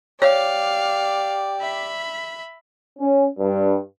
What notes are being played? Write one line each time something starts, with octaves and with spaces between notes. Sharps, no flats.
G4 C#5 D5 F5
E5 B5
C#4
G2